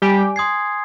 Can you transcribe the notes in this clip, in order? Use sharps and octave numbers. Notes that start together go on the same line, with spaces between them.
G3 G4 G#5
C6 D#6 G#6 C7